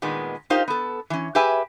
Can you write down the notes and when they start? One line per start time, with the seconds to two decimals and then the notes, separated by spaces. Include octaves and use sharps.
0.02 A#2 D#3 G#3 B3
0.50 D#4 F4 G4 A#4 C5 F5
0.68 B3 A4
1.10 E3 C#4
1.35 G4 G#4 B4 E5 G#5